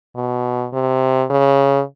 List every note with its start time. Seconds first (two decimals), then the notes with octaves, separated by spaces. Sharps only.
0.16 B2
0.73 C3
1.30 C#3